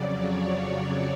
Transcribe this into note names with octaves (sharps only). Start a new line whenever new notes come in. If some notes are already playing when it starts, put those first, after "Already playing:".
Already playing: F2 C#3 F#3 D5
C#5